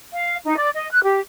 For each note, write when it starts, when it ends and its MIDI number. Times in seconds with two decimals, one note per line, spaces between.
0.14 0.36 77
0.45 0.57 63
0.57 0.68 74
0.74 0.89 75
0.91 1.03 90
1.03 1.18 67